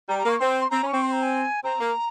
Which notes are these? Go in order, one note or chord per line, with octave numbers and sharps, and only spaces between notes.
G3 A#5
A#5
A#3 C#6
C4 C6
C6
C4 A#5
C#4
C4 C#6
C6
A#5
G#5
C4 A#5
A#3